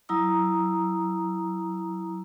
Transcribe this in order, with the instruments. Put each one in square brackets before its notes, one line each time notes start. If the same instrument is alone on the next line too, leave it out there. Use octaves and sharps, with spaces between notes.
[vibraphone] F#3 E4 A#5 D#6 E6